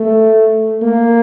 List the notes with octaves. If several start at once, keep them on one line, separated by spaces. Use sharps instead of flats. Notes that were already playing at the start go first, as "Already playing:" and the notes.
Already playing: A3
A#3